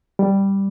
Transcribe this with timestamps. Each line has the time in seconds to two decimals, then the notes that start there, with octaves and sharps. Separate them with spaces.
0.19 G3